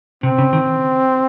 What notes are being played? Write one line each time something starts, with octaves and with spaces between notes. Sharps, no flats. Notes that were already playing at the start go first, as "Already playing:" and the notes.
C3 C4
C#3
D#3